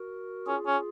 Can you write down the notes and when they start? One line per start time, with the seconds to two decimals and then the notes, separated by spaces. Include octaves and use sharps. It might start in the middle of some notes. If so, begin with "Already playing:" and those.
Already playing: F#4 A#4
0.46 C#4 F4 G#4
0.67 C#4